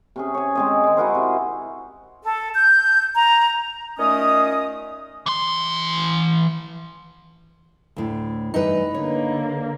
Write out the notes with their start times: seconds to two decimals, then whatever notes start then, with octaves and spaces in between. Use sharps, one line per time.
0.16 C3 C#4 G#4
0.34 C#5 G#5
0.55 G#3 C4 D#5
0.84 D#3 G#3
0.97 E4 F#4 A#4 C5
1.15 C3
2.23 A4
2.54 G6
3.16 A#5
3.98 A#2 D#3 A3 C#4 D#5 D#6
5.26 E3 C6
7.96 D2 A2
8.54 G2 E3 D#4 B4
8.94 D3 A#3 C#5